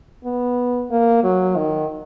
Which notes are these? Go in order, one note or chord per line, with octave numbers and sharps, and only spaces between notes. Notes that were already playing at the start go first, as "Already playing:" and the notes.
B3
A#3
F#3
D#3